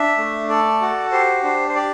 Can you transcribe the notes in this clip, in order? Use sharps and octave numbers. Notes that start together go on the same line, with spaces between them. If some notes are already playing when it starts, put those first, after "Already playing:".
Already playing: D4 E5
A3
A4 D5
F#4
G4 C5
D4 C5
C5
G4 D5